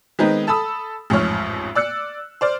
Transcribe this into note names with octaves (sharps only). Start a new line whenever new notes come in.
D#3 G#3 B3 C4 D#4
A4 A5 B5 D#6 E6
A1 F2 G#2 C#5 F6
D5 E6 F#6 C#7
C5 D5 F6